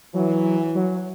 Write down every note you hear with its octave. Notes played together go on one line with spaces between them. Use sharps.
E3 F#3
F#3